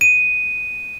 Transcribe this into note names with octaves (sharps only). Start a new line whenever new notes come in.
D#7